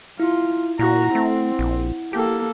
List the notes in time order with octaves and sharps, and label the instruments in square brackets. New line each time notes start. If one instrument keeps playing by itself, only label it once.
[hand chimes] E4 [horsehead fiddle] F4
[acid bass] A#2 [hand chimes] E4 F#5 [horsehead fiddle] F#4 A#5
[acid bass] A3 [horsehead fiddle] C4
[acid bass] A#1
[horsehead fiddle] A#3 A4 [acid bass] G4